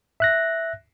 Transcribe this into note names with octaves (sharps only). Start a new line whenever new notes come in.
E5 F#6 A#6